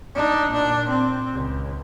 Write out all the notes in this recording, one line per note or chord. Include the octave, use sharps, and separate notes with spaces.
D4 D#4
A#2 D4
C4
C#2